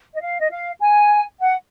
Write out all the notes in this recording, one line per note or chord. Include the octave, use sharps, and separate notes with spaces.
D#5
F5
D#5
F5
G#5
F#5